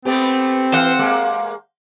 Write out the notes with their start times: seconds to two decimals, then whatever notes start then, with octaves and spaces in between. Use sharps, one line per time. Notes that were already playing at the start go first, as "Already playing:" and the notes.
0.05 A3 B3 C4 G4
0.72 E3 C5 F5 F#5
0.99 G#3 A#3